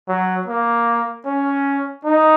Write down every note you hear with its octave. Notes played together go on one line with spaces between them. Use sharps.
F#3
A#3
C#4
D#4